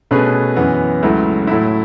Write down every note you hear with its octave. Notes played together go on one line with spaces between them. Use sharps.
B2 A3 C#4 G#4 B4
F#2 E3 B3
C#2 C#3 F#3 A3 E4
A2 F#3 A3 E4